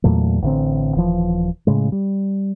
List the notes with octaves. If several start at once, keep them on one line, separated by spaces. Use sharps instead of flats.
E2 A#2 F#3 A3
A1 D3 C4
D#1 E3 F3
A2 C#3 G#3
G3